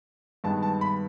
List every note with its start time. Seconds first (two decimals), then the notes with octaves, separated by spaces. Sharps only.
0.44 G2 D#3 G#3 B3 A5
0.63 A5
0.81 B5